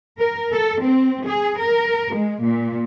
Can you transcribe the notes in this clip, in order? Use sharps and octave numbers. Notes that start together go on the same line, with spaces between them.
A#4
A4
C4
G#4
A#4
G#3
A#2